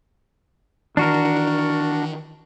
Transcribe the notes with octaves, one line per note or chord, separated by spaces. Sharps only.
D#3 E3 D4 F#4 A#4